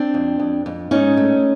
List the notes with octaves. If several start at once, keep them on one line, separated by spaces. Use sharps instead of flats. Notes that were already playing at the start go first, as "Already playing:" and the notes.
Already playing: C4 D4
F2
F2
F2
G#2 C#4 D#4
A3